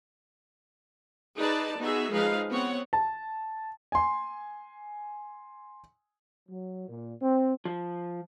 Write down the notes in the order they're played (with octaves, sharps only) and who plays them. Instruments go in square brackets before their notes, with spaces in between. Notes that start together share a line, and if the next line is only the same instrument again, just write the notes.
[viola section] D#4 G#4 B4 D5 A5
B3 D#4 F#4 G#4 E5
F3 G#3 D#4 G#4 B4 F5
B3 C4 C#5 F#5
[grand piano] A5
[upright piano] G#5 C6
[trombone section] F#3
A#2
C4
[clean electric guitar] F3